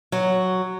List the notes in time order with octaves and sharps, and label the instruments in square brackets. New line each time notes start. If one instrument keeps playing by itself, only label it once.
[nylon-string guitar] F#3